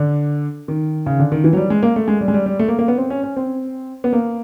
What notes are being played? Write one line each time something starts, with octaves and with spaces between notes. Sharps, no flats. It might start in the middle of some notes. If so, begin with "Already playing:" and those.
Already playing: D3
D#3
C#3
D3
D#3
E3
F#3
G3
G#3
A#3
A3
G#3
G3
G#3
G3
G3
A3
A#3
A#3
B3
C4
C#4
C#4
C4
B3
A#3